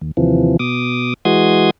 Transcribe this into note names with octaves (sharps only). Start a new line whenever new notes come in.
D#2
D#2 C3 E3 F3
B2 D6 D#6
E3 G#3 F#4 C6 D#6 G#6